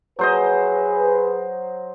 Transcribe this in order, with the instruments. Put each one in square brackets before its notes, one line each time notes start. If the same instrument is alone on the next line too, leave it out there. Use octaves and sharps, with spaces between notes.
[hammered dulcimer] F#3 C5 D#5 [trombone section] G#4 B4